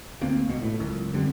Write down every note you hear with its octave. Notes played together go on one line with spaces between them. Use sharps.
D2 A#3 C4
C#2 B2
A2
F#1 C#2 F#2
F1 D3 G3 C4